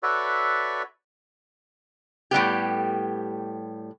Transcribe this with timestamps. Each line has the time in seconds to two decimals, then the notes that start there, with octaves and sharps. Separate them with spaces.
0.03 F#4 A4 B4 C#5 D5 E5
2.31 A2 G3 B3 G4